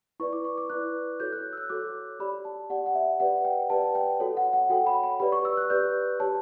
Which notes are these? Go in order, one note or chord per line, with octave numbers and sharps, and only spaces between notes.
E4 B4 D5 C#6
D6
C#6
D6
E4 B4 D5 F#6
F#4 A4 C#5 G6
F#6
E6
F#6
F#4 A4 C#5 D6
G4 D5 B5
A5
G4 D5 F#5
F#5
E5
G4 B4 D5 F#5
G5
G4 B4 D5 A5
G5
F#4 A4 C#5
F#5
F#5
F#4 A4 C#5 G5
B5
B5
G4 B4 D5 B5
C#6
E6
F#6
G4 B4 D5 G6
G4 C#5 A5